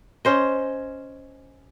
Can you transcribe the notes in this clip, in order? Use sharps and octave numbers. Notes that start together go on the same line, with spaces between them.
C#4 C5 D#5